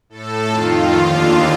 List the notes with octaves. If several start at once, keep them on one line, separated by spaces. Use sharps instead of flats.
A2 A4
F2 D#3 F4
D#2 D3 F4